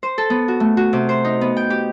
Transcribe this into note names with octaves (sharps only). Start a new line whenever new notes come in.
C5
A4
B3
F#4
A3
F#4
C3
C5
D#4
B3
G5
G4